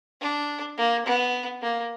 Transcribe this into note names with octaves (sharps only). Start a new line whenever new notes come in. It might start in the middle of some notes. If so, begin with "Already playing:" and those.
D4
A#3
B3
A#3